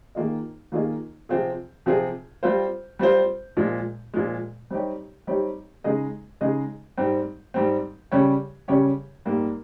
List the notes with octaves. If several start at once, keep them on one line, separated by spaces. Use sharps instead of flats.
D#3 A#3 F4 G#4 D#5
D#3 A#3 F4 G#4 D#5
C3 F3 C4 F4 G#4
C3 F3 C4 F4 G#4
G3 C4 F4 C5
G3 C4 F4 C5
A#2 F3 G#3
A#2 F3 G#3
G3 C4 D#4 G4 C#5
G3 C4 D#4 G4 C#5
C#3 G#3 D#4 G#4 D#5
C#3 G#3 D#4 G#4 D#5
G#2 G3 C4
G#2 G3 C4
C#3 G3 C#4 G4 C#5
C#3 G3 C#4 G4 C#5
G#2 G3 A#3